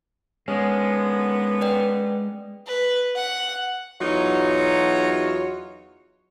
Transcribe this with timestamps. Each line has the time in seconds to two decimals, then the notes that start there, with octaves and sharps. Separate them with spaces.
0.48 D3 D#3 G#3 B3 C#4
1.61 B4 D5 G5
2.67 B4
3.15 F#5
4.01 E2 F#3 D#4 F4 F#4 C#5